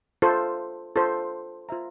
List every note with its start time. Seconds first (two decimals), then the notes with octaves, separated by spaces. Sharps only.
0.22 F4 A4 C5
0.96 F4 A4 C5
1.69 F4 C5 E5 A#5